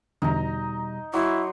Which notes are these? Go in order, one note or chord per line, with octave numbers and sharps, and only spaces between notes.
E2 B2 D3 G3 D#4 A#5
F#3 E4 C6 D6